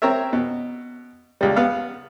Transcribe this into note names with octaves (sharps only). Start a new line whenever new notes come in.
C4 A#4 C#5 E5
B2
C#2 G3
B3 F5